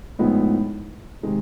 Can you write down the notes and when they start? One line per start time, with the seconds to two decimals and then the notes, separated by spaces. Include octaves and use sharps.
0.19 A2 F3 G#3 B3 D#4
1.23 C3 D#3 G#3